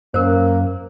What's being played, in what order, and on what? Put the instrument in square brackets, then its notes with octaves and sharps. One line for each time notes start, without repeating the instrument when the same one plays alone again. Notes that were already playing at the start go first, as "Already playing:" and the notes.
[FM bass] F#2 [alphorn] A#3 [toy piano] A#4 C5